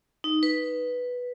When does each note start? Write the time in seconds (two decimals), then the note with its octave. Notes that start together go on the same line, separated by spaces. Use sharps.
0.24 D#4
0.43 B4